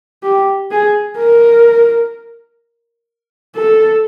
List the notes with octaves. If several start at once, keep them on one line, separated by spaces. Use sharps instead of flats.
G4
G#4
A#4
A4